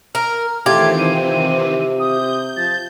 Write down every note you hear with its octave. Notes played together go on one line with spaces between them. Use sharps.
A#4 F6
D#3 E3 A3 C4 F4 G4 G#6
C3 D#7
D#6 G6
F3 A6